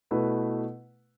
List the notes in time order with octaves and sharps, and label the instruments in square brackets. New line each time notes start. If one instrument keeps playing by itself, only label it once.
[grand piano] B2 A3 E4 B4